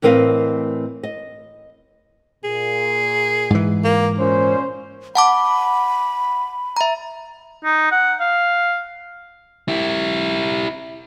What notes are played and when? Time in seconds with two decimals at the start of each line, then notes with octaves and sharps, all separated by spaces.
0.02 A2 E3 C4 A#4 D#5 F5
1.03 D#5
2.44 A#2 G#4
3.50 G#2 E3
3.84 A#3
4.18 A#2 C#4 C5
5.15 F#5 A5 B5 D6
6.77 E5 A#5
7.64 D#4
7.92 F#5
8.20 F5
9.68 E4 G4